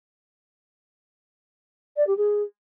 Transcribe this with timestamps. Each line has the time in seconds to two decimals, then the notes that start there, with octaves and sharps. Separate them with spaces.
1.96 D5
2.07 G4
2.17 G#4